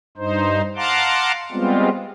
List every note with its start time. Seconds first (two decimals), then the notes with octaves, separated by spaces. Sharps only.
0.17 G2 D#4 C5
0.76 F5 F#5 A5 A#5 C6 D6
1.52 G3 G#3 B3 C4 F4